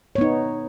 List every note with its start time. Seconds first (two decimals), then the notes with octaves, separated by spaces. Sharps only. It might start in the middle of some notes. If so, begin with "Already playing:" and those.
0.15 C#5
0.18 B3
0.21 D#4